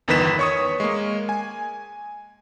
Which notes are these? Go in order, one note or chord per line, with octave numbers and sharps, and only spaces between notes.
G1 E2 D#3 B4 B6 E7
C#5 C#6 D#6
G#3 A#3
G#5